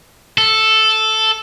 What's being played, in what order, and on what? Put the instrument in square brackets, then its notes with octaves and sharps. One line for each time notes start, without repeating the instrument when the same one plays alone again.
[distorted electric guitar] A4